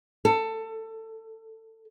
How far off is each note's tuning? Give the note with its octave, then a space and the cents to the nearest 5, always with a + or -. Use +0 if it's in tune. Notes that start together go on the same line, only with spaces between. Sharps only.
A4 +20